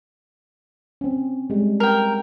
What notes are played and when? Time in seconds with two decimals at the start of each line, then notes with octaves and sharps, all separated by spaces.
1.01 C4 C#4
1.50 G3 G#3
1.80 A#4 G5